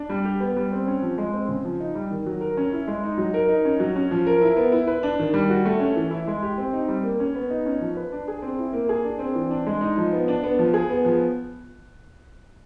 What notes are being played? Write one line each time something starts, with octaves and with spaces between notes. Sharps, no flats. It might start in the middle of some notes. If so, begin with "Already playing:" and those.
Already playing: D4
G3
G4
B3
G3
C4
C#4
F3
G#3
C4
C#3
F3
D#4
G3
D#3
F#3
A#4
C#4
E4
G#3
D#4
F#3
A#4
D#4
C#4
F#3
C#4
F3
A#4
E4
B3
E4
B4
D4
D#3
G3
F#4
A3
C#4
E3
E4
G#3
G4
C4
D#4
G3
A#3
C#4
B3
D#4
C#4
F3
B4
D4
G#4
C4
E4
A#3
G#4
D4
C4
E3
D4
G#3
D#4
F3
B3
D4
B3
F3
G#4
B3
F3